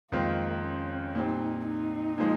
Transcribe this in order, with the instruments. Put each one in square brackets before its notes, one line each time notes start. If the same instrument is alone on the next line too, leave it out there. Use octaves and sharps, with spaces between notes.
[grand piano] F2 D#3 G#3 C4 F4 [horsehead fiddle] A#3
[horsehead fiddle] C#4
[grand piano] A#2 G3 C4 [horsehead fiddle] D#4
[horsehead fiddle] D#4
[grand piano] A#2 F3 G#3